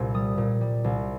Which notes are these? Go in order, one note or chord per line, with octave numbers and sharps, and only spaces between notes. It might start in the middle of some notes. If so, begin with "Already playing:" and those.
Already playing: C2 A#2
G3 D#6
A#2
G3
C2